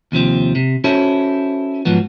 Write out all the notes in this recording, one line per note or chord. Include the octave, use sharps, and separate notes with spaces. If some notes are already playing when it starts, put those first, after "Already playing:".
D#2 C3 F3 C4
C3
C#4 E4 F#4 A4 C5 C#5
G#2 F3 F#3 B3